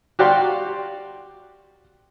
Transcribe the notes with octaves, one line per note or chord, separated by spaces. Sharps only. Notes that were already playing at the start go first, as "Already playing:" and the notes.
F#4 G4 D5 F5 C6